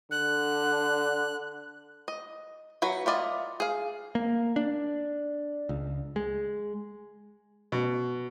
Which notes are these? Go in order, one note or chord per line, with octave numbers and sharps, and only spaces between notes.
D3 F#6
D#5
F#3 F#4 B4
E4 F4 D5 D#5
G#4 F5
A#3
D4
C#2
G#3
B2